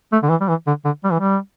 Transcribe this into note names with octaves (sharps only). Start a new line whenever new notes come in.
A3
D3
E3
G3
E3
D3
D3
G3
E3
G3